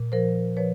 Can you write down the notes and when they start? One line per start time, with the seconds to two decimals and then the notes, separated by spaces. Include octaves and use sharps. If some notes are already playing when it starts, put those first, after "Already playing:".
Already playing: A#2
0.12 F3 A#4 C5
0.57 F3 B4 C#5